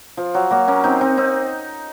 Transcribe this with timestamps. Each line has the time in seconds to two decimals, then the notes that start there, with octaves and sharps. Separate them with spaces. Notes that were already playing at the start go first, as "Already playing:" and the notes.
0.17 F3
0.34 F#3
0.50 F#3 A#3
0.68 A#3 C#4
0.84 C4 D#4
1.01 C4 D#4
1.17 C4 D#4